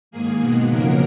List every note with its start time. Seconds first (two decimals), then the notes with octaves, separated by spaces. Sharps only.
0.11 G#2 D#3 A#3 G#4
0.40 B2 G#3 B3
0.69 F2 C#3 F#3 A#3 A#4